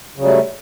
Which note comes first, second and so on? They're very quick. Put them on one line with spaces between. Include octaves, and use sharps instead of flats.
C#3 F#3 G3 A3